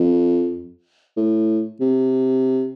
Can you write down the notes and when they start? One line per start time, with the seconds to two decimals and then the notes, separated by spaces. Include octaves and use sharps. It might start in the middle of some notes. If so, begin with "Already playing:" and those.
Already playing: F2
1.17 A2
1.81 C3